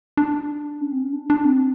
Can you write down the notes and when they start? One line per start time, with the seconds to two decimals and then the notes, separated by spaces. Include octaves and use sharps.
0.17 D4
0.81 C#4
0.92 C4
1.02 C#4
1.13 D4
1.30 D4
1.45 C4